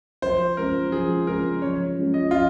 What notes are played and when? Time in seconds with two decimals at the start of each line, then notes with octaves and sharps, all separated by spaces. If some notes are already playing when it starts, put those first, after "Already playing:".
0.22 F3 C5
0.57 G#3 C#4 F4 A#4
0.91 F3 G#4
1.26 G#3 C#4 F4 A#4
1.62 F3 C#5
1.97 G#3 C#4 F4
2.14 D#5
2.31 F3 F4